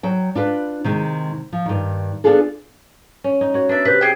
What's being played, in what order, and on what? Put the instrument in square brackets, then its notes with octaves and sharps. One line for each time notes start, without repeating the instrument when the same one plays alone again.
[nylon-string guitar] F#3 G5
D4 F4 B4
C3 D#3 G#3
F3
G2 D#3
B3 D4 D#4 F4 G#4 A4
[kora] C#4
D#4
F#4 C#5
[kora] B3 [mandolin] D4 E5
[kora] C3 [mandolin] B4 G6
[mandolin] G#4 G5